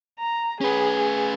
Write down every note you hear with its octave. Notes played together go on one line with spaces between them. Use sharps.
A#5
C#4 G#4 B4